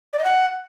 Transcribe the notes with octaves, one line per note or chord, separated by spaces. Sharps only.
D5
D#5
F#5